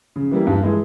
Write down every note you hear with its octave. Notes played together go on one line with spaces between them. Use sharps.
C#3
E3 G3 A#3
G2
E3 G#3